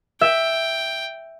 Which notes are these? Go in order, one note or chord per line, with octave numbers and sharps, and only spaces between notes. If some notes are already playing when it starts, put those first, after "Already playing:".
E5 G5